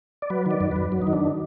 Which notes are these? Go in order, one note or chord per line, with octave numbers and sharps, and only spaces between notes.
D5
F#3 B4
D#3 D5
F#2
F#2 B4
F#3
D#4
D#3
D4